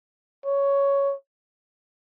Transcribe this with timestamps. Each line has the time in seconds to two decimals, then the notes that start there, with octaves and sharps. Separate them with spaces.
0.45 C#5